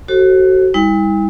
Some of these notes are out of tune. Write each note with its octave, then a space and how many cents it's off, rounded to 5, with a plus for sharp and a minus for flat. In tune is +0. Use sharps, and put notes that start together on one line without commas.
F#4 +25 A4 +0 C5 +35
G3 +40 E4 -45